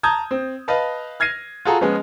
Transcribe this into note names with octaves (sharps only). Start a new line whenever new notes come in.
A5 A#5 D#6 G6 G#6
C4
B4 D#5 F5 A5
F6 G#6 A#6 C7 D#7
F4 F#4 G#4 A4 A#5
F3 G#3 B3 C#4